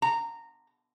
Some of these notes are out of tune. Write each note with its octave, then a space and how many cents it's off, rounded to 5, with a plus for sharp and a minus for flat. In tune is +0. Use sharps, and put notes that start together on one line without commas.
A#5 -15